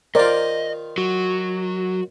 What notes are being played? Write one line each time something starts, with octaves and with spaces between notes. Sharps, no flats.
D#3 F4 A#4 C5 D5 D#5
F#3 F#4